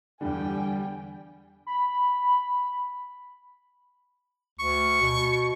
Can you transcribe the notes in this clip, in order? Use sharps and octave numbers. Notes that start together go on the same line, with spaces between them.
E2 D3 G3 G5 G#5
B5
D2 C#6
B2